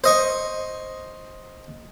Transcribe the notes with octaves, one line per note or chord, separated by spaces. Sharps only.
C5 D#5 C#6